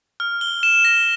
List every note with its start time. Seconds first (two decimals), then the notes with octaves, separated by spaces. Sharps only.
0.20 F6
0.41 G7
0.63 E7
0.85 A#6